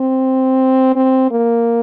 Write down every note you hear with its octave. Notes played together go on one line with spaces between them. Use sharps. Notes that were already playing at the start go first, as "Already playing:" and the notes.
Already playing: C4
C4
A#3